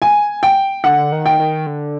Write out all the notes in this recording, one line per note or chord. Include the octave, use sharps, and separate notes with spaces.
G#5
G5
D3 F#5
D#3
G5
D#3
D3